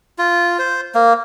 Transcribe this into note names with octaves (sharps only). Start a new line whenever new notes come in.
F4
C5
A#3